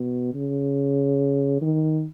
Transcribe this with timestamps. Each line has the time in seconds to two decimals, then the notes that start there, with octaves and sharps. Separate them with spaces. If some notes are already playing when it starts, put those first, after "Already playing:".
Already playing: B2
0.34 C#3
1.61 D#3